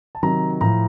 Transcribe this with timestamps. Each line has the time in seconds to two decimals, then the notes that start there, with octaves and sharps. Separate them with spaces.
0.15 A5
0.23 C3 D#3 F#3 A#5
0.61 A2 F3 A#5